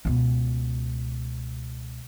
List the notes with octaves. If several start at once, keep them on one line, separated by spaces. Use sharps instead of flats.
C#2 B2